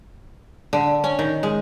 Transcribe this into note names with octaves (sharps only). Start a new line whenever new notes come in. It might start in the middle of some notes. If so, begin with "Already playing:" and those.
D3
C#4
D#3
G#3